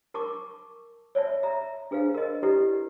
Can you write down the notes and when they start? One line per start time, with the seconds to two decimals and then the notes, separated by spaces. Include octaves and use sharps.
0.14 A#4 A5 C#6 D6
1.15 C#5 D5 E5 A5
1.43 E5 A#5
1.91 D4 G#4 B4 C5 F5
2.15 A#4 D#5
2.43 E4 G4 A4 B4 D5 D#5